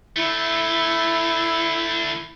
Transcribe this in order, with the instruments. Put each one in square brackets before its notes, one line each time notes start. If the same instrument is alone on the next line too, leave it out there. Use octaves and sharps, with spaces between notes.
[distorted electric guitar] D3 A3 [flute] E4